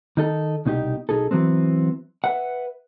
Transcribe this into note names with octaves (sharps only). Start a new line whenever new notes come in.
D#3 D#4 A4
C2 B2 D#4 F4 G4
B1 D#4 G#4 A4
E3 F#3 B3 C4
B4 E5 F#5